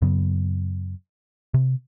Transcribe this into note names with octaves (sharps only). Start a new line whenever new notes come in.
F#2 C#3 F#3 B3
C3